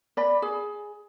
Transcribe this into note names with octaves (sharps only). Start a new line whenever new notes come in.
D5 B5
G#4